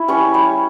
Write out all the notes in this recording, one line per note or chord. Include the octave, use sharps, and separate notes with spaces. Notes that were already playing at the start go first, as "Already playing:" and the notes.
Already playing: E4
G3 C#4 C#5
G3